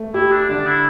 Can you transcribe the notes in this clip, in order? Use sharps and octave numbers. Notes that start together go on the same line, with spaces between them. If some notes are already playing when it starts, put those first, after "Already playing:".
Already playing: A3
E4 G4
D4
D3 D4
E4